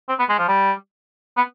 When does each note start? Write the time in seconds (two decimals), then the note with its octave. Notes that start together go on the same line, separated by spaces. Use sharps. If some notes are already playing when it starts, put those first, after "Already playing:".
0.09 C4
0.19 B3
0.29 G#3
0.38 F3
0.48 G3
1.37 B3